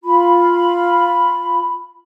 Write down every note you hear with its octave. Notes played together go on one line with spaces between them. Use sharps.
F4 B5